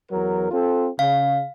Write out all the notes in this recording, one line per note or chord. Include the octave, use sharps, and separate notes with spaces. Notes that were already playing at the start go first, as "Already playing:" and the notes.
E2 F#3 A#4
C4 F4 A4
C#3 F5